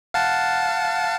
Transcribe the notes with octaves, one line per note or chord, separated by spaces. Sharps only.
F5 F#5 A5